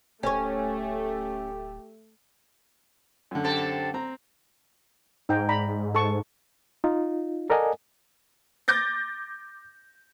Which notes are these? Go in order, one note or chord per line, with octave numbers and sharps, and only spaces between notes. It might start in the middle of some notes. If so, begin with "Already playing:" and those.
D1 A3 C#4 G4 C#5
F#2 D3
C4 G4 A4
C4 A#5
G#2 D#4 G5 A#5
D5 A#5 B5
A4 A5 C#6
D#4 F4
A4 A#4 D5 D#5 F#5 G#5
D6 G6 A6 A#6